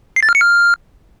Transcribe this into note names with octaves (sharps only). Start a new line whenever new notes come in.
C7
A6
F6
C#7
F6